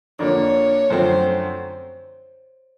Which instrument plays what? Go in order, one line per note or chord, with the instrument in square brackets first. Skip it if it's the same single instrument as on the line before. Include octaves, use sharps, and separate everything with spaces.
[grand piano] F2 D3 F3 A#3 D4 [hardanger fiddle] C#5
[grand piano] F#2 D3 F3 A3 C4 [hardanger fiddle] C5